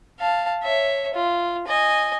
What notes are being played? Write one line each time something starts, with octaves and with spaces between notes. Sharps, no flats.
F5 A5
C#5 E5
F4
D#5 G#5